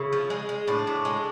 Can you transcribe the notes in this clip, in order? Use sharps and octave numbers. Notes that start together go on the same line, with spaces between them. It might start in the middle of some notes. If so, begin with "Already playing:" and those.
Already playing: C#3 E4
F3
G#3
G#3
A2 D4
A2
G#3